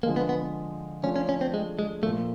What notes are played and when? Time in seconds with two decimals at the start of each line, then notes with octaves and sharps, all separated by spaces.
0.03 D3 F3 G#3 A#3
0.16 B3
0.29 B3
1.03 F3 A3 C#4 D4 F4 A4
1.16 C#4
1.29 C#4
1.41 C4
1.54 G#3
1.79 G#3
2.02 A#2 F3 A3 A#3